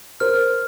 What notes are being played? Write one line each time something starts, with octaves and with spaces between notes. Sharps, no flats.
A#4 C5 F6